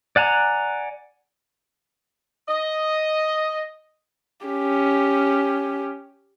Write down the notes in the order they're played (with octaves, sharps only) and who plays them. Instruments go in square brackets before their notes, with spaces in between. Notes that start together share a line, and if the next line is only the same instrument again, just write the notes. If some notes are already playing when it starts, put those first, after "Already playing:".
[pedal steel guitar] D5 F#5 G#5 A#5
[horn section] D#5
[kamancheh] C#4 G4